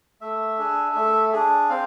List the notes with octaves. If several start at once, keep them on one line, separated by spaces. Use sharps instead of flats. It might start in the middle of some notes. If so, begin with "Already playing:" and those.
A3 E5
D4 G#4
A3
D4 G#4
C4 F5